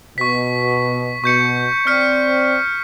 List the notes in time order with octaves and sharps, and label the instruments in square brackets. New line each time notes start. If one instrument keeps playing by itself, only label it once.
[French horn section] B2 [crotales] C#6 B6
[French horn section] B2 [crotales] C#6 G6 C#7
[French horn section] C4 D5 [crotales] F6 B6 C#7